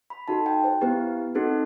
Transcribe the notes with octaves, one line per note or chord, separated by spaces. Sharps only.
B5
D#4 F#4 A4 A5
G5
C5
B3 E4 G4 B4
C4 D#4 F#4 A4